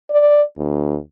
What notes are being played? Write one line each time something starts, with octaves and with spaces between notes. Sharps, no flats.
D5
D2